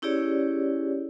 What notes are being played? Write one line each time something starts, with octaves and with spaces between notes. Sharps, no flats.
C#4 E4 G4 G#4 C#5 D5